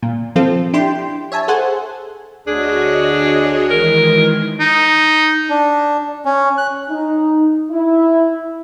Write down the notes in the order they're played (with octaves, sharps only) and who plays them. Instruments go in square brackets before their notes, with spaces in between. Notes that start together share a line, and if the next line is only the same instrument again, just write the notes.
[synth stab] A#2
F3 C4 F4 A4
D4 E4 G4 G5 C6
C#5 E5 G#5 A5
G#4 A4 C5 F#5 G#5
[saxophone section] D2 D3 G#4 [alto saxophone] D4 [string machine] F#4 C#5 D#5
[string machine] D#3 E3 G#3 [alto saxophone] A#4
[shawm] D#4
[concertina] D4
C#4
F#6
[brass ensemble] D#4
E4